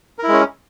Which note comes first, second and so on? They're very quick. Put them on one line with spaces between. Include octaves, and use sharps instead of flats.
A#4 E4 G#3 C#4